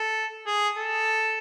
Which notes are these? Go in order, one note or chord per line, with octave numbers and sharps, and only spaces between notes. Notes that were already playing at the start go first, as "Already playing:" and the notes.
Already playing: A4
G#4
A4